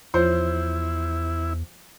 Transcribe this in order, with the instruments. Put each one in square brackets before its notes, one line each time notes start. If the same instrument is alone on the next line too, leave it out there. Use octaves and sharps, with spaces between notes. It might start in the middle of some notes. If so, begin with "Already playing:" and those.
[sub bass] E2 [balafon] F3 F4 C#5 [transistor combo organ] E4 [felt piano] C5